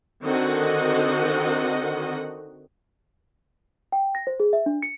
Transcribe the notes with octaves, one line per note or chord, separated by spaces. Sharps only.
D3 D#3 C4 F#4 D#5 F#5
G5
A#6
C5
G#4
E5
D4
C#7